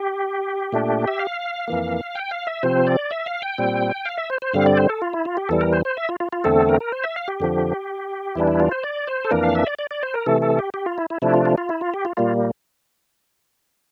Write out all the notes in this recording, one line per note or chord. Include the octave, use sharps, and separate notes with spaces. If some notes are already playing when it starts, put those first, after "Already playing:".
Already playing: G4
A#2 A3 D4
E5
F5
F2 E3 A#3
G5
F5
E5
C3 F3 C4 C5
D5
E5
F5
G5
A#2 G3 C4
F5
E5
C5
C5
G2 D3 G3 C4 F5
D5
C5
A4
F4
E4
F4
G4
E2 E3 G3 A4
A#4
C5
C5
E5
F4
F4
F4
E2 D3 A3 C4 A4
A#4
A#4
C5
E5
F5
G4
F2 D3 F3
E2 E3 G3 D4 E4
E4
F4
C5
D5
C5
A4
F2 E3 A#3 D4 A#4
F5
E5
D5
D5
D5
C5
A#4
C3 E3 A3 A4
A4
G4
G4
F4
E4
E4
C3 F3 A3 D4 E4
F4
F4
F4
E4
F4
G4
F4
A#2 G3 A#3 F4